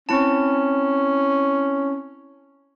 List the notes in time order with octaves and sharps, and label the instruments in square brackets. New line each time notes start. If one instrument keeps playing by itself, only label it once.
[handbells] C4 E4 A5 [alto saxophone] C#4